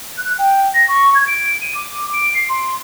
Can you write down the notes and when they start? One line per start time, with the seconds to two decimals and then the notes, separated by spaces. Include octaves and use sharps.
0.18 F#6
0.39 G5
0.74 A#6
0.88 C#6
1.15 G#6
1.27 D7
1.61 D#7
1.75 D6
2.13 D7
2.35 C7
2.49 C6